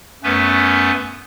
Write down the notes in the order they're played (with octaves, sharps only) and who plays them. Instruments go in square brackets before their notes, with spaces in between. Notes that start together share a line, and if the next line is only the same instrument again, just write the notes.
[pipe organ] F#2 A3 B3 C#4 B4